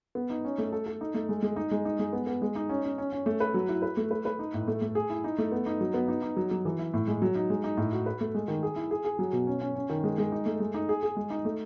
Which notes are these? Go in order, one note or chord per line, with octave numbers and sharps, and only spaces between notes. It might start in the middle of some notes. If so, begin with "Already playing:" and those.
B3
D#4
C#4
A3
A4
A4
D#4
A3
G#3
G#3
D#4
G#3
D#4
G#3
B3
B3
G#3
D#4
C#4
C#4
C#4
C#4
A3
B4
F#3
E4
B4
A3
B4
B4
D#4
A2
A3
A3
G#4
E4
D#4
A3
B3
D#4
F#3
B3
D#4
D#4
F#3
F#3
E3
E4
A2
G#3
F#3
D#4
G#3
D#4
A2
F#4
B4
A3
G#3
D#3
G#4
E4
G#4
G#4
F#3
B2
C#4
C#4
C#4
D#3
G#3
G#3
D#4
A3
G#3
D#4
G#4
G#4
G#3
D#4
A3